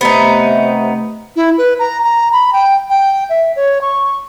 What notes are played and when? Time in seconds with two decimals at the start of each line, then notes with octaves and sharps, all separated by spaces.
0.01 C3 A3 B3 D#4
1.36 E4
1.58 B4
1.79 A#5
2.04 A#5
2.32 B5
2.53 G5
2.90 G5
3.29 E5
3.56 C#5
3.81 C#6